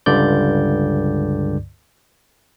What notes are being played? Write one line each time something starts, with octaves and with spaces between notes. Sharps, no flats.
C#2 G2 D3 D5 G6